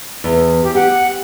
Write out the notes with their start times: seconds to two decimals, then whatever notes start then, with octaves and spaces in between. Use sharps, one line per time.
0.24 E2
0.63 G4
0.75 G4 F#5